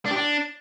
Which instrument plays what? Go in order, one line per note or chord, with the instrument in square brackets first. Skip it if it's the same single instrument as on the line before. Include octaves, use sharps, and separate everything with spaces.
[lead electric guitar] D4
G4
D4